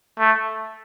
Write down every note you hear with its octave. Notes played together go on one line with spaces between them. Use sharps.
A3